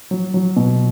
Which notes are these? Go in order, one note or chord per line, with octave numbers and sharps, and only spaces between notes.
F#3
F#3
B2